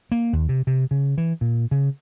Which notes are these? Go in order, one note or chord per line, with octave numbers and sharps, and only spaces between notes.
A#3
D#2
C3
C3
C#3
E3
A#2
C#3